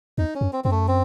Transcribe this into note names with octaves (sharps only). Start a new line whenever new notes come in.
E2 D#4
C#4
F#2
C4
F#2 C4
A3
C4